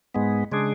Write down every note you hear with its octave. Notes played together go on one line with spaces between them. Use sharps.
G#2 G#3 B3
C#3 G#3 D4 G#4